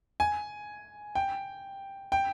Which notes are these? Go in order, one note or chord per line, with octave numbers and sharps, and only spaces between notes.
G#5
G5
G5